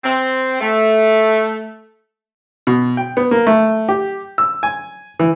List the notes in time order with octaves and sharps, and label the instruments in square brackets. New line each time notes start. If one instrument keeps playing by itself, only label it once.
[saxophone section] C4
A3
[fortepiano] B2
G5
B3
A#3
A3
G4
E6
G#5
E3